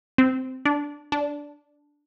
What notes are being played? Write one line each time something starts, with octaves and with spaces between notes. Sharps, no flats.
C4
D4
D4